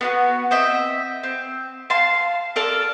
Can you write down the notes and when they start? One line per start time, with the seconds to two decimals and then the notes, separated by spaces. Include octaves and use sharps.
0.01 B3 D4 F#4
0.51 C4 D#5 E5
1.23 C4
1.90 F5 A5 C6
2.56 A4 A#4 D5